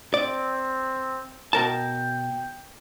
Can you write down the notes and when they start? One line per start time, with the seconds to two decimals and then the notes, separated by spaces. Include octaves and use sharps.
0.14 C4 D5
1.53 B2 A#4 G5 A5